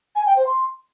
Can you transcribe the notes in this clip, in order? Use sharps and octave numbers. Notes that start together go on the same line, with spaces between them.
G#5
G5
C5
C6